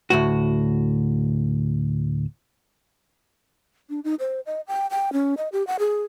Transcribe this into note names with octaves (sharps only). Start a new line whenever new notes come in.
D2 A2 F#4
D4
D#4
C5
D#5
G5
G5
C#4
D#5
G4
F#5
G#4